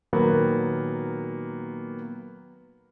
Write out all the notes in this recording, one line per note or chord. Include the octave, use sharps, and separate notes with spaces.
A#2 D#3 F#3 A#3 B3